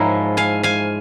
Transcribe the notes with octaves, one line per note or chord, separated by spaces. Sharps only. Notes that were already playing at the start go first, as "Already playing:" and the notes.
Already playing: G#2 F3 G#3 E4 A#4 C#5
F5 G#5
F5 G#5